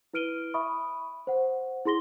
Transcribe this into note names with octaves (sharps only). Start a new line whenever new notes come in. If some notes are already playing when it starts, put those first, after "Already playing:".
E4 B4 F6 D7 D#7 G7
E5 B5 C#6 D#6
C5 F#5
E4 G#4 C6 A#6 G7